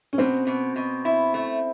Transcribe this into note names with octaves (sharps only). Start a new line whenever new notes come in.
C#4
B2 C4
B2
B2
E4
A3